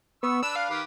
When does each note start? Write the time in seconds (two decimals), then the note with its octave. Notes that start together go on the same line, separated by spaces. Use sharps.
0.23 B3 C#6 E6
0.43 D4 B4 E6
0.56 F5
0.70 D#3 G4 B4